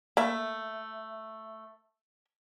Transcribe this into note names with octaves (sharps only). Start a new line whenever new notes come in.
A3 A#3 E5 B5